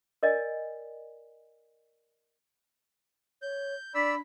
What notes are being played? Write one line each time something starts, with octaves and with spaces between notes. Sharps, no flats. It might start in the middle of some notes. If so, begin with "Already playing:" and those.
A#4 D5 D#5 G#5
C#5 G6
D4 D5 B5 E6 B6